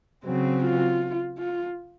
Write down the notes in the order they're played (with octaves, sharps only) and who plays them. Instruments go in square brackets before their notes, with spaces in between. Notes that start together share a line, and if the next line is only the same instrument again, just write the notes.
[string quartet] C#3 F#3 C4
[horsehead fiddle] F4
F4